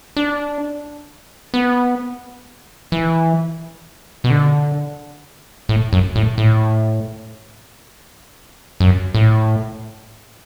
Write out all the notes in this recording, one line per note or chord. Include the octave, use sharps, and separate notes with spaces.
D4
B3
E3
B2
D3
A2
F#2
A2
A2
F#2
A2